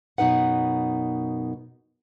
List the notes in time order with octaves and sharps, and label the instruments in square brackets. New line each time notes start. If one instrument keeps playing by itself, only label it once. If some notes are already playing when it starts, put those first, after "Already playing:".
[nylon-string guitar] F#2 B2 D3 D#4 B4 F#5